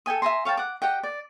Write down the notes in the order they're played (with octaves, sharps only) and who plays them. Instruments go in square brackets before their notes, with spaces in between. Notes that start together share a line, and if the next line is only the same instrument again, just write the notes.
[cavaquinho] A4 G5 G#5 D#6
E5 G#5 A#5 C6
C#5 F5 G5 A5
F#5 D6
G4 D#5 F#5 G5
D5